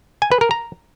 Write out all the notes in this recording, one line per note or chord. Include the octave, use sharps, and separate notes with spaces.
G#5
B4
A#4
A#5